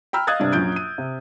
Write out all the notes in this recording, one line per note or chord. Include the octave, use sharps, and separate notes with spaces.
G5 A#5 B5 E6 F6
D#5 F5 D#6 F#6 G#6 A6
G2 C3 D4
A#1 F#2 F#3 G6 D7
D#7
C3